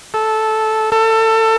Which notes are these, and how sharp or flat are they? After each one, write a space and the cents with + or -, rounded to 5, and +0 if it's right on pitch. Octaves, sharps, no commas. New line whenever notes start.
A4 -10
A4 +25